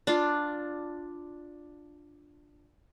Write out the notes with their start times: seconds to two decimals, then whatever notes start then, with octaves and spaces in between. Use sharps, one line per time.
0.07 D4 F4